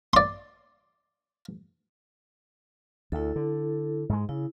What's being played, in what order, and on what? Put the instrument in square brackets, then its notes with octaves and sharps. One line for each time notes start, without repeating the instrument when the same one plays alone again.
[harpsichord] D5 C6
[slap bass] D2 [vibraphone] E4 A4
[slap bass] D3
G#2 G#3
[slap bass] C#3 [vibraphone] E4